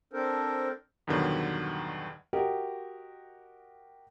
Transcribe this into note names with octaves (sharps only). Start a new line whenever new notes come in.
C4 D4 A4 A#4 C5
E2 G2 B2 D3 D#3 F#3
F#4 G4 A#4 D#5 G5